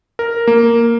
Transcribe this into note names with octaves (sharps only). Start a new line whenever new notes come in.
A#4
A#3